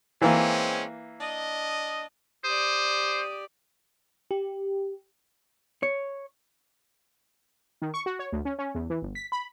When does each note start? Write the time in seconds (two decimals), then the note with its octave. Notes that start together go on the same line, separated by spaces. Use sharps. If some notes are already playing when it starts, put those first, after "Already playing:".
0.22 E3 G#3 A#3 C4 C#4
1.20 D4 D#5
2.45 G4 C5 D5 D#6
4.31 G4
5.83 C#5
7.82 D#3
7.94 C#6
8.06 F#4
8.19 C#5
8.32 D2
8.45 C#4
8.59 C#4
8.75 E2
8.90 E3
9.02 G1
9.15 B6
9.32 B5